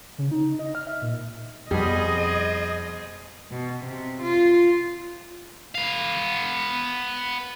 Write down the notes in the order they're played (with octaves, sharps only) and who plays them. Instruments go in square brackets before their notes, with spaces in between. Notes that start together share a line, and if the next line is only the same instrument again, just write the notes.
[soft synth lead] C#3
D#4
D#4
D#5
F6
E5
A#2
[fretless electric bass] F2 [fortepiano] B2 G3 [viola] G#4 C5 [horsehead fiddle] D#5
[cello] B2
C3
F4
[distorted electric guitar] B3 F5